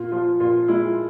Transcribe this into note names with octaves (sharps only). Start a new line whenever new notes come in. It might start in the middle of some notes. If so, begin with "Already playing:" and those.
Already playing: A#2 F4
F3 F4
A#2 F4
G#3 E4